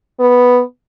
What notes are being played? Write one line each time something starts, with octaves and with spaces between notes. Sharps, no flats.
B3